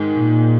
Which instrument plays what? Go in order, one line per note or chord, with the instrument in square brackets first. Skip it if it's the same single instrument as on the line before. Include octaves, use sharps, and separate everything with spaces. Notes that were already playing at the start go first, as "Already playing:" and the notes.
Already playing: [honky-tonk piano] G#2 D#3 G#3
[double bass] A#2